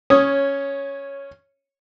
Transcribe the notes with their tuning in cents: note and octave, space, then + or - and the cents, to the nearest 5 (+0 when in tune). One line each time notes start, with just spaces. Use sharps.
C#4 +0 C#5 -10 D#6 +0